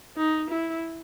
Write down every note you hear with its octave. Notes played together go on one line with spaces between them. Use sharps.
D#4
E4